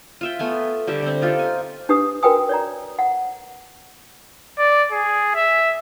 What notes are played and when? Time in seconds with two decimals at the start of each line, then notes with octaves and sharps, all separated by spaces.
0.21 F4 E5 G5
0.39 A3 B3 G#5
0.87 D3 G3 G4 E5
1.02 D3 C4
1.22 D#4 F4 G4 A4
1.39 G#5
1.89 D4 G4 B4 D#6
2.23 F#4 A#4 B4 G5 G#5 D#6
2.49 C#5 D5 A#5
2.99 F#5
4.59 D5
4.92 G#4
5.35 E5